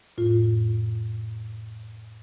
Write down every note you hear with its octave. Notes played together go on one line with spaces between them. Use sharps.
F2 A2 F4